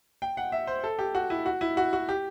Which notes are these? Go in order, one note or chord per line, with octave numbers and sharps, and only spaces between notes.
G5
F#5
E5
C5
A4
G4
F#4
E4
F#4
E4
F#4
F#4
G4